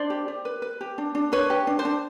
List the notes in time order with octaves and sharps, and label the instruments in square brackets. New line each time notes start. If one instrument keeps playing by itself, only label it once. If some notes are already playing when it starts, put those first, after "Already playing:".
Already playing: [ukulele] D4 C5 D5
G4
G4
B4
B4
G4
D4
D4
D4 B4 C#5
G4
D4
C5
D4